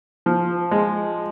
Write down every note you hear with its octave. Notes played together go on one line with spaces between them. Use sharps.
F3
G#3